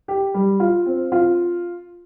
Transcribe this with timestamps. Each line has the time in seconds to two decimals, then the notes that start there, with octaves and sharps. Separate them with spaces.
0.08 G4
0.34 G3
0.60 F4
0.86 C4
1.12 F4